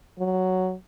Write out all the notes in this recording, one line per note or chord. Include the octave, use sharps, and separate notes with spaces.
F#3